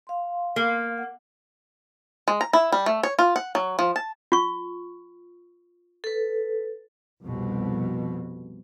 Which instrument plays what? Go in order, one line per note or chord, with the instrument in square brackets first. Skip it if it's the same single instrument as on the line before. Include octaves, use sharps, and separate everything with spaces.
[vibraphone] F5 C6
[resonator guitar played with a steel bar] A#3
[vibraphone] F#5
[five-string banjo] G#3
A#5
E4
G3
A3
C#5
F4
F#5
F#3
F3
A5
[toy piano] F4 C#6
[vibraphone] A4 B4
[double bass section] C2 F2 B2